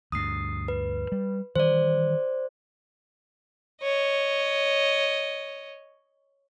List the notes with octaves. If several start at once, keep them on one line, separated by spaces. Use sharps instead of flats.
D2 G2 D#6 C7
B4
G3
D#3 E3 G3 C5 D5
C#5 D#5